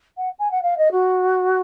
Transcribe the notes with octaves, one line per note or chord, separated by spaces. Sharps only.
F#5
G#5
F#5
F5
D#5
F#4